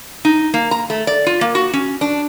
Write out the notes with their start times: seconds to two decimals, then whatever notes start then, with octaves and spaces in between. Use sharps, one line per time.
0.25 D#4
0.54 A#3
0.71 A#5
0.90 A3
1.07 D5
1.27 F4
1.41 A#3
1.55 F#4
1.73 C#4
2.01 D4